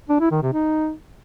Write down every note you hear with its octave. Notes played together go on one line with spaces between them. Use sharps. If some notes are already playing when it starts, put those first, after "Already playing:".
D4
E4
D#3
C3
D#4